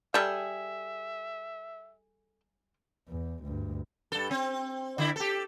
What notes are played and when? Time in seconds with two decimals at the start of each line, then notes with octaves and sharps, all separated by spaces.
0.14 G3 G#4 A4 E5 G5
3.08 E2
3.44 D2 G2
4.12 G2 A4
4.31 C4
4.98 D3 E4
5.16 G4 A4